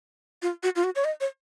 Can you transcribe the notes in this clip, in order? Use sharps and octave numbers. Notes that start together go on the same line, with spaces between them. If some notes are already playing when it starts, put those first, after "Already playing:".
F4
F#4
F4
F#4
C#5
D#5
C#5